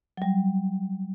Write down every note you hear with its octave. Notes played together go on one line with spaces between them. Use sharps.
F#3 G3